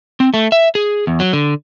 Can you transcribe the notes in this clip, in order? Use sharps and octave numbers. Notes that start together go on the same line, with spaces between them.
C4
A3
E5
G#4
E2
F#3
D3